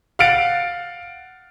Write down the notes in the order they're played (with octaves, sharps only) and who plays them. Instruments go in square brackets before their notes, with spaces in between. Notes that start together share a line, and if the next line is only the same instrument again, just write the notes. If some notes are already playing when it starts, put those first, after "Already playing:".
[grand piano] F5 F#5 F6 F#6 A6 D7